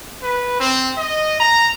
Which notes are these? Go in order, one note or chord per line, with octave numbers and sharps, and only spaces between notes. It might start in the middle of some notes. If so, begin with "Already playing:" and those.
B4
C4
D#5
A#5